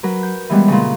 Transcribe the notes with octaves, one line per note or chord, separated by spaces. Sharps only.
F#3 A#4 B4
G6
E3 G3 G#3 B3
A#2 C#3